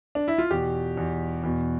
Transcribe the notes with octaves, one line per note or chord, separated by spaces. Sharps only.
D4
E4
F4
E2 B2 G4
E2 B2
E2 B2